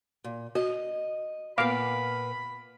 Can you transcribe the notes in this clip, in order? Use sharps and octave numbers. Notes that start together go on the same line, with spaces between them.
A#2
F#4 D#5
A#2 B3 F5 B5 D6